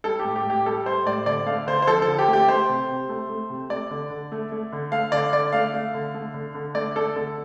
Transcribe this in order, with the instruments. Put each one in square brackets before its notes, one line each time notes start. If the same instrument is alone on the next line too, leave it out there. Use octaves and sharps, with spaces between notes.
[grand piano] G3 A4
G4
A2
G4
A2
G4
G3 A4
G3 C5
A2 D5
D3 D5
A3 F5
D3 C5
C5
F3 A4
A4
D3
G4
A3
G4
A3 C5
C3
C3
A3
A3
C3
A3 D5
D3
D3
A3
A3
D3
A3 F5
D3 D5
D3 D5
A3 F5
A3
D3
A3
D3
D3
A3 D5
A3 A4
D3 A4